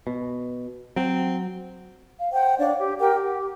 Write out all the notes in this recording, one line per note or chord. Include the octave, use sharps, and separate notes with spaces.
B2
F#3 C4
F5
C5 F#5 G5
D4 C#5 D5 F5
G4
G4 A#4 F#5 G5
G4